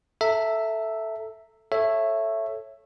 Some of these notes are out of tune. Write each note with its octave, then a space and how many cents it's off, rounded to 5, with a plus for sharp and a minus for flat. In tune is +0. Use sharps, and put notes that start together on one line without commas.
A4 +0 E5 +0 A#5 -25
A4 +0 C#5 -10 E5 +10